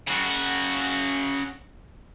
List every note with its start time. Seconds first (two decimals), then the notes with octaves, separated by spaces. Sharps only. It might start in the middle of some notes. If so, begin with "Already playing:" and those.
0.08 C#3 F#4